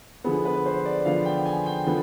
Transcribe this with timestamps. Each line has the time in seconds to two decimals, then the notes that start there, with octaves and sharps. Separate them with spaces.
0.24 D3 F3 B3 G#4
0.45 B4
0.66 C5
0.85 D5
1.05 D3 F3 B3 F5
1.25 G5
1.46 G#5
1.66 G5
1.87 D3 F3 B3